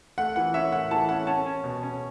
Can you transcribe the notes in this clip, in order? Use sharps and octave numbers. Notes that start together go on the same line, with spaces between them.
A3 F#5
E3 F#5
C#4 E5
A2 F#5
E3 A5
C#4 F#5
C#4 A5
C#4
B2
C#4